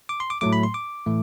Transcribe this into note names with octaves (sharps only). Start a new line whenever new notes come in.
D6
C6
D6
A2 F#3 A3 D6
B5
C6
D6
A2 E3 A3